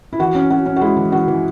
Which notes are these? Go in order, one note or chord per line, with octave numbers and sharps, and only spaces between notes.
E4
E3 F#4
C#4
C#4 F#4
C#4
F#4
G#3 E4
E3
E3 F#4
E3